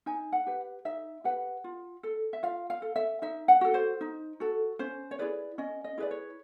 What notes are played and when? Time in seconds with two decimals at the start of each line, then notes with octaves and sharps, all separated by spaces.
0.06 D#4 G#5
0.32 F#5
0.46 G4 B4
0.85 D#4 E5
1.24 G4 B4 F#5
1.64 F4
2.03 A4
2.33 E5
2.43 F4 F5
2.70 F5
2.82 A4
2.96 E5
3.22 D#4 E5
3.48 F#5
3.61 F#4 A4
3.74 C5
4.01 D#4
4.40 F#4 A4
4.79 C#4 C5
5.11 C#5
5.19 E4 G#4 B4 D5
5.58 C#4 D#5
5.84 D#5
5.98 E4 G#4 B4 D5
6.11 C#5